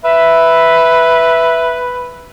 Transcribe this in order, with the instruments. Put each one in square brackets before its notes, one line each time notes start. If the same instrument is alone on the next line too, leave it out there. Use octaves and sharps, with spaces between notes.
[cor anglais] B4 [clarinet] E5